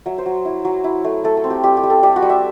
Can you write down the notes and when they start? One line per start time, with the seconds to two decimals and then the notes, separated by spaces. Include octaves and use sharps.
0.06 F#3 E5
0.18 C5
0.26 F#3
0.45 E4
0.65 F#3
0.84 E4
1.04 A3
1.24 A3 A4
1.37 A4
1.44 C4
1.50 G4
1.63 G3 G4
1.77 G4
1.83 G3
1.90 A4
2.03 G3 G4
2.16 F#4
2.22 G3
2.29 E5